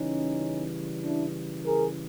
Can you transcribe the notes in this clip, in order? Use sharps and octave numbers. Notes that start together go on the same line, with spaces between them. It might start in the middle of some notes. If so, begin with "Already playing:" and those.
Already playing: C#3 E3 G3 C#4 D#4
D4 E4
G#4 A#4